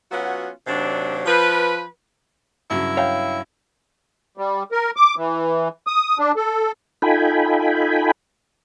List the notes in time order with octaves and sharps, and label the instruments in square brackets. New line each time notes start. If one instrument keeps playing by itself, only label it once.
[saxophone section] F#3 B3 C#4 F4 F#4
D#2 C3 F#3 D4
F3 B4
[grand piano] G2 C#3 F#3 [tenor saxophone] E4
[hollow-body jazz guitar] C#5 F5 G5
[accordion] G3
A#4
D6
E3
D#6
D4
A4
[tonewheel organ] D#4 F4 A4 G5 G#5 B5